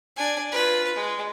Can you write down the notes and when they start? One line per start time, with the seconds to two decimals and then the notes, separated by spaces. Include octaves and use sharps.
0.16 D4 G#5
0.52 F4 B4
0.95 G#3